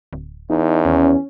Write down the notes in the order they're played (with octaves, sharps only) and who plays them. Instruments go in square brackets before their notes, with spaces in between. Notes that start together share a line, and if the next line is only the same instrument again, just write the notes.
[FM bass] D1
[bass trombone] E2 [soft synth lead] D#4
[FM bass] D#2 [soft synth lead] C#4